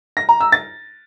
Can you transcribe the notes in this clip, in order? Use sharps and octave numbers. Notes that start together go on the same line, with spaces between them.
A#6
A#5
E6
A6